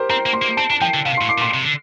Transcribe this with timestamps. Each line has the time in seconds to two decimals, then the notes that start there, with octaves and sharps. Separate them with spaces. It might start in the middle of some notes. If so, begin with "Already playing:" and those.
Already playing: G4 A#4 C5
0.10 C4 A#5
0.26 A#3
0.33 C6
0.42 A#3
0.57 C4 A5
0.70 D4 A5
0.81 F3 G5
0.94 D3
1.05 C3 F5
1.17 C6
1.21 A2
1.29 D6
1.38 A#2
1.41 C6
1.54 C3
1.62 D3